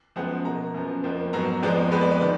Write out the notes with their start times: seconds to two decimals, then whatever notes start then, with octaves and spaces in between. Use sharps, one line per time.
0.16 F#2 F3 G#3 B3 F#5
0.45 B2 A#3 A#5
0.74 F#2 F3 B3
1.03 F2 F3 A#3
1.33 G#2 F#3 B3 A#5
1.62 F2 F3 G#3 B3 D5
1.91 F2 F3 G#3 B3 B4
2.01 D5
2.11 B4
2.21 D#3 D5